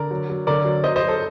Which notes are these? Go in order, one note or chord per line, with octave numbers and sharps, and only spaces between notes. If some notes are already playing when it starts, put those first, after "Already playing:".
Already playing: D3 A#4 D5
F#3
F#3
D3 A#4 D5
F#3
F#3 C5 D#5
C5 D#5
F#3
A4 C5